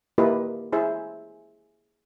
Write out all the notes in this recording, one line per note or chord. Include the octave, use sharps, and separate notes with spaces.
A#3 E4 F4 G4 B4 D#5
E4 G#4 C5 E5